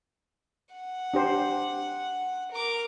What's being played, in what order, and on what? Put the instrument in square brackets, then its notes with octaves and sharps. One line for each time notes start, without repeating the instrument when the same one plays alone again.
[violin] F#5
[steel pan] D4 G4 C5
[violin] A#4 D6